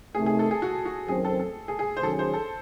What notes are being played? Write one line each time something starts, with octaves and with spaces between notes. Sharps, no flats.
C3 D#3 A3 G#4
G#4
A4
G#4
F#4
F#4
F#2 D#3 F#3 C4 G#4
A4
A4
G#4
G#4
C5
D#3 F#3 C#4 G#4 A4
C5
A4